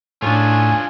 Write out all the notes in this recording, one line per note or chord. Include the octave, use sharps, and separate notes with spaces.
A2 C#4 D4 F4 G#4